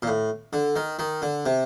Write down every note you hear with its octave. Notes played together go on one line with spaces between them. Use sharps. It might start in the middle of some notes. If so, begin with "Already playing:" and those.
A#2
A2
D3
D#3
D#3
D3
C3